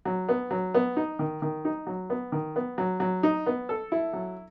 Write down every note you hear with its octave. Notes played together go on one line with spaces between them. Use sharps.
F#3
B3
F#3
B3
D#4
D#3
D#3
D#4
F#3
B3
D#3
B3
F#3
F#3
D#4
B3
A4
E4
F#3